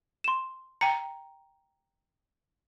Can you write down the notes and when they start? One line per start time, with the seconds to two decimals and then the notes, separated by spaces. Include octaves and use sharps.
0.24 C6 E7
0.81 G5 A#5 C#7